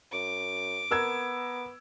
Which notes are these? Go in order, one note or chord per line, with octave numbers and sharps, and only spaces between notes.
F#2 D6
B3 A#4 E6 G#6